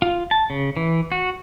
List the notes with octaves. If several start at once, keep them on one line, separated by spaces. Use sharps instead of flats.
F4
A5
C#3
E3
F#4